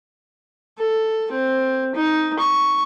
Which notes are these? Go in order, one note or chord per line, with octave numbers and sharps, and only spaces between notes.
A4
C4
D#4
C#6